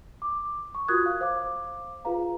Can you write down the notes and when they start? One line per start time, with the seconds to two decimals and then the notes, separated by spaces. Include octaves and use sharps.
0.22 D6
0.75 C#6
0.88 F4 F#4 A#4 D#6 F#6 G#6
1.06 F5
1.21 C5 F5 D6
2.05 F4 G#4 B4 F5 A#5